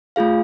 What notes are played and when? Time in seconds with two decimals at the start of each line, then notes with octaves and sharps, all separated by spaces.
0.16 A3 F4 G#4 F5